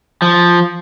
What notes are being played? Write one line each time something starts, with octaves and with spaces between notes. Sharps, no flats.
F3